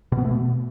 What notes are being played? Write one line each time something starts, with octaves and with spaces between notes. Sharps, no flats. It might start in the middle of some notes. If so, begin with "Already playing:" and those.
B2
B3
A3
B2